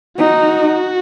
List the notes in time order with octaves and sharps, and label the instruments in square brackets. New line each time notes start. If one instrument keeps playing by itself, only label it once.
[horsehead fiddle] D#4 [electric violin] F#4